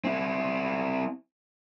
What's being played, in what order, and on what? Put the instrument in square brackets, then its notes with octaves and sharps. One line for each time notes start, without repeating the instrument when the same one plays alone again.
[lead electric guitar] C4 E4